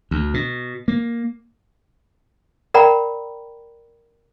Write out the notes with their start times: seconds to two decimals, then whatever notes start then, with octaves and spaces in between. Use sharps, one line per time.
0.11 D2
0.34 B2
0.88 A#3
2.74 A#4 D5 F#5 G5 A#5 B5